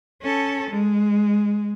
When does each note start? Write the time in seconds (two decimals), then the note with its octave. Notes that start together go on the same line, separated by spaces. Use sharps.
0.22 C#4 A4
0.70 G#3